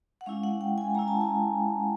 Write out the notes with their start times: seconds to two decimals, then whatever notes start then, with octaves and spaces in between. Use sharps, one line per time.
0.21 F#5
0.26 G#3 C#4 E4 F5
0.43 F#5
0.61 G5
0.78 G#5
0.95 G#3 C#4 E4 A#5
1.08 A5
1.21 G#5